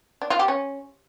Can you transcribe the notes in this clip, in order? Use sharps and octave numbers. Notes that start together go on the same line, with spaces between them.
D4
F4
G4
C#4